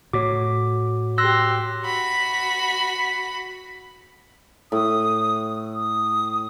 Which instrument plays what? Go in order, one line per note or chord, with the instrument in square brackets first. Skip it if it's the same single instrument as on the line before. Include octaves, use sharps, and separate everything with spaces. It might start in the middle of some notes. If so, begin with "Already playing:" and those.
[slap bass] A2 [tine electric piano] F#4 C#5 [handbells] D6
[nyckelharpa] G4 C6 [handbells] E6 F#6 A#6
[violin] F#4 B5
[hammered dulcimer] A2 [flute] D#6
[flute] D#6